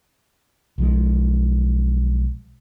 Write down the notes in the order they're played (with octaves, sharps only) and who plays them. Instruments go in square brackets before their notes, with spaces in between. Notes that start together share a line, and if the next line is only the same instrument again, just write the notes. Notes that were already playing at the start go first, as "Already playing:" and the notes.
[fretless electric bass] B1 F3 G#3